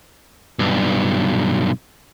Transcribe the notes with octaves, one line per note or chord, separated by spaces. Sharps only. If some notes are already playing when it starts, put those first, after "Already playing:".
B1 G2